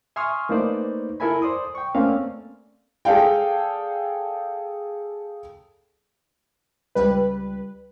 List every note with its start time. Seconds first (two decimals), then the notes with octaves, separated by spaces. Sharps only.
0.16 E5 G#5 C6 C#6 D#6 F6
0.49 A3 A#3 D#4 B4 C5 D5
1.20 E4 A4 A#4 E5 G#5 B5
1.42 C5 D5 C6 D#6
1.75 G5 C#6
1.95 A3 A#3 C4 C#4 D5 F5
3.05 G#4 A4 D5 F5 G5
6.95 C#2 G3 B4